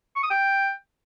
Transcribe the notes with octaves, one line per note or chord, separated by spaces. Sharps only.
C#6
D#6
G5